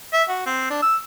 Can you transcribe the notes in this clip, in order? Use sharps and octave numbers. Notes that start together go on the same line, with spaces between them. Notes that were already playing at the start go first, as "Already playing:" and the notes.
E5
F#4
C4
D4
E6